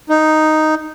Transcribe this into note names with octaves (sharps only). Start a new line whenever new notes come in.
D#4